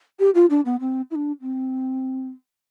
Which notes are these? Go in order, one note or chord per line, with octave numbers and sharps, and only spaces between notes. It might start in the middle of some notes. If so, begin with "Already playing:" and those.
G4
F4
D4
B3
C4
E4
D4
C4